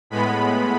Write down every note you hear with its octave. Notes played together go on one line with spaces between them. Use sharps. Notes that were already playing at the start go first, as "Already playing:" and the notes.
A2 G#3 B3 B5